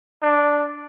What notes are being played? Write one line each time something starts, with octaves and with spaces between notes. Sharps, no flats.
D4